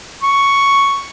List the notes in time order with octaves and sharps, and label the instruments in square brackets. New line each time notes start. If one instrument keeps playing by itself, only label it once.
[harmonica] C#6